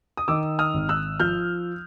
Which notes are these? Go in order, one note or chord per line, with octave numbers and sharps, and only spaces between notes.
D#6
D#3 D6 E6
D#6 F6
G#1
E6 F#6
F3 F6 G6